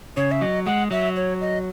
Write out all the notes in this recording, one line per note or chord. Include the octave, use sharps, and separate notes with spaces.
C#3 C#5
E5
F#3 D#5
G#3 F#5
F#3 E5
C#5
D#5